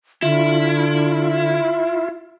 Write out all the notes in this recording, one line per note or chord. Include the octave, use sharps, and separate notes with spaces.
D3 E4 F4